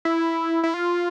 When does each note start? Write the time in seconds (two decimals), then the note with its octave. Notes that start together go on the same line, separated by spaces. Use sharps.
0.05 E4
0.63 E4
0.74 F4